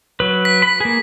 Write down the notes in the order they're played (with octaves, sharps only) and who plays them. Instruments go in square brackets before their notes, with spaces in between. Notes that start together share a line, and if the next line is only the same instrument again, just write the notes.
[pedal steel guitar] F#3 B4
[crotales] B6
[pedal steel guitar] B5
A#3 G#4